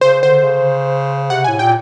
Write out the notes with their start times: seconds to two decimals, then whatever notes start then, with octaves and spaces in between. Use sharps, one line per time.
0.01 C#3 C5
0.23 D3 C5
0.44 C#3
1.30 C3 F#5
1.44 A2 G#5
1.59 A#2 G5